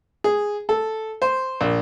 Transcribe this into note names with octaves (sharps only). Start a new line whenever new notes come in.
G#4
A4
C5
A#1